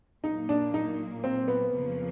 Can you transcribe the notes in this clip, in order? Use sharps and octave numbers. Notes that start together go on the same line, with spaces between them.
A#2 F#3 A#3 D#4
D4
D#4
C4
B3
F2 C#3 F3 A#3